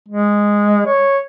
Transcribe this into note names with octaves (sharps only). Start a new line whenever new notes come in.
G#3
C#5